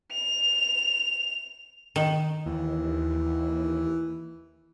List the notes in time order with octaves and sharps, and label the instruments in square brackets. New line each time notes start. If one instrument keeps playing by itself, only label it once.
[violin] F7
[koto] D#3
[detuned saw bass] D#2 [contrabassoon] E3